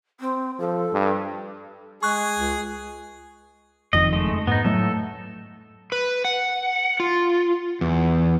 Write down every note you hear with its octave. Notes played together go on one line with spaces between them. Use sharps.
C4
F3 A4
G2
G#3 G#4 C#6 F#6
C#2
F#1 F2 D#3 D#5
G#3 A3
G#2 B3 D#4
A2 F#3 A3 A4
B4
F#5
F4
E2